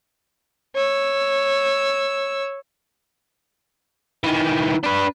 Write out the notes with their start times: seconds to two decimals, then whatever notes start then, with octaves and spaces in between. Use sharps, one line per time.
0.76 C#5 E6
4.24 D#3 E3
4.83 D4 B4